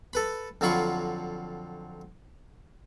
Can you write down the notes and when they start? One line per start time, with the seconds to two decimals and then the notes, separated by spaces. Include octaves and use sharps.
0.13 A4 B4 B5
0.61 F2 D3 F#3 F4 B5 C#6